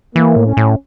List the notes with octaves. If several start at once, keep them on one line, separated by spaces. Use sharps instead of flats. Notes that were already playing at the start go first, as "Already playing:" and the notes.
E3 A#3
A2
C#4
A2